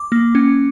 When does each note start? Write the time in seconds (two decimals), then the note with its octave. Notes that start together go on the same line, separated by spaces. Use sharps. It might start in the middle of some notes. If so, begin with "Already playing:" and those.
Already playing: D6
0.12 A#3
0.35 C#4